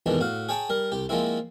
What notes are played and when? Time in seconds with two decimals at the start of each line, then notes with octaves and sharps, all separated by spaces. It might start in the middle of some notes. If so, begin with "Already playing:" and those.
0.06 F2 G#2 B2 D#3 E3 D4
0.20 A2 F#4 F5
0.49 G#4 C#5 G5 A5
0.70 G3 A#4
0.92 C2 G4
1.09 F3 G#3 A#3 C4 E4